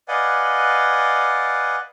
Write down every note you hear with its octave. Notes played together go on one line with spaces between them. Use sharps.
B4 D5 D#5 F5 F#5 G#5